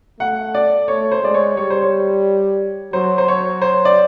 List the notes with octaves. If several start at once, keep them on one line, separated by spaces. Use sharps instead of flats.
A3 F#5
D5
A3 C#5
C5
G#3 D5
C#5
G3 C#5
C5
C#5
F#3 C5
C5
C#5
C5
D5